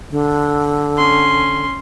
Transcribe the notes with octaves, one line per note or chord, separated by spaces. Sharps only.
D3
C#4 C6